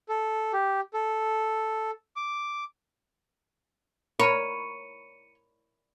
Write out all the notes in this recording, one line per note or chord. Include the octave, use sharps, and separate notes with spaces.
A4
G4
A4
D6
A#4 C#5 B5 C#7 D#7